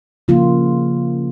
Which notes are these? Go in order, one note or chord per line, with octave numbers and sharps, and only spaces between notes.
C#3 F3 A#3 F4